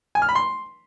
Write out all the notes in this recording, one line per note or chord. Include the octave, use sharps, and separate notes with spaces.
G#5
F6
B5
C6